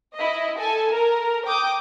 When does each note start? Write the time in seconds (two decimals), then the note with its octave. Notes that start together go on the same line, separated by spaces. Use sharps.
0.15 E4 D#5
0.59 A4 G#5 A5
0.91 A#4
1.46 G5 D6 D#6 G6